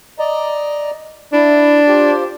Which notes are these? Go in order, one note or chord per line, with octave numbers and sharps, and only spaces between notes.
D5 D#5 A#5
D4 E4
F4 G4 C5